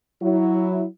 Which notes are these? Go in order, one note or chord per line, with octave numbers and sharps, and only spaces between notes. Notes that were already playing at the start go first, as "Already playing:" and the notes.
F#3 E4